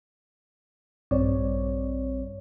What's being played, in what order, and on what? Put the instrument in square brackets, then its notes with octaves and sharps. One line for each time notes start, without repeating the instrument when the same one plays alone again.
[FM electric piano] A#1 G2 G3 C4 C#5 D5